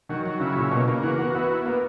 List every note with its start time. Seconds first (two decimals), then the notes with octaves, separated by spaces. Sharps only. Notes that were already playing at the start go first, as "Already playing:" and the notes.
0.09 D#3 F#3
0.26 F#3
0.40 C#3 E4
0.56 A#2 C#4
0.71 B2 A#3
0.87 C#3 A#3
1.03 E3 F#4
1.18 B3 F#4
1.35 B3 E4
1.50 E4
1.65 A#3 B3